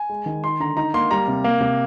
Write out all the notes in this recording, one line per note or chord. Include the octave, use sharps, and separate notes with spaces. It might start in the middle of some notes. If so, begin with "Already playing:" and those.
Already playing: G#5
G#3
D#3
D#4 C6
D3 A#5
D#4 A#5
A#3 C6
G3 A#5
C3
A#3
C3